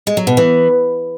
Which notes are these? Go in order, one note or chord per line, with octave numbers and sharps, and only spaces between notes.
G#3
F#3
B2
E3